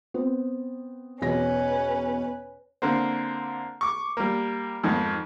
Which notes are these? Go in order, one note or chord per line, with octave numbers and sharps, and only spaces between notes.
B3 C4
E2 B2 C#4 B4 A#6
D3 A#3 C4
C#6 D6
G3 A#3
F2 G#2 D#3